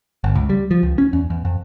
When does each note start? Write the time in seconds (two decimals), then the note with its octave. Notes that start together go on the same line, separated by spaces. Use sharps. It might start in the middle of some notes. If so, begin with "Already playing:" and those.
0.24 G1
0.35 C#2
0.50 G3
0.71 F3
0.83 C#2
0.98 C#4
1.13 E2
1.30 E2
1.45 F2